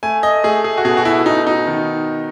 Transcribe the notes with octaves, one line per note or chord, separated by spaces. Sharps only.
A3 G#5
D#5
A3 G#4
G#4
F#4
B2 G#4
F#4
E4
B2 D#4
D#4
D#3